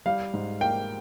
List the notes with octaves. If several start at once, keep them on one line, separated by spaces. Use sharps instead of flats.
G3 F5
G#2
A#3 G5